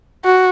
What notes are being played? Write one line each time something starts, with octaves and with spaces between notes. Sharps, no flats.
F#4